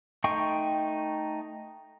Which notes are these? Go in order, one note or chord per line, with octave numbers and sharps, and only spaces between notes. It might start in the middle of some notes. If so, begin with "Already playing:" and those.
A3 D#4 G5 C6 C#6